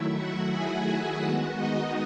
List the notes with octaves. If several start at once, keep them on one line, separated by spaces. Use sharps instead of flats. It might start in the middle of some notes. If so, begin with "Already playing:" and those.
Already playing: D#3 F#3 A3 E4 E5
F#4 F#5
G#4 G#5
D#3 G#3 B3 F#4 F#5
D#4 D#5